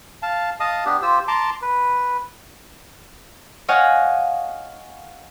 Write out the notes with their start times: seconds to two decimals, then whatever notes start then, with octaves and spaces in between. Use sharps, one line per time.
0.22 F5 A5
0.60 D#5 F5 A5 D#6
0.85 B3 D4 G4
1.02 F4 G4 C5 E6
1.28 A5 A#5 C6 D6
1.62 B4
3.68 C#5 D#5 F5 F#5 G#5